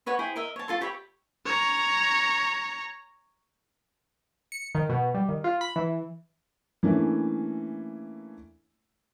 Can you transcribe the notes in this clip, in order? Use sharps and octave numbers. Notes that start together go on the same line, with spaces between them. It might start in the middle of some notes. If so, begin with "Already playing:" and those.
F#4 B4 C#5 D#5
E4 G#4 C5 G5
A#4 D#5 E5
C#5 A5
F4 A4 C6
G4 C#5 E5 B5
C#5 A#5
C#7
D#3
B2
G3
D#3
F4
B5
E3
E3 A3 A#3 C#4 D4 E4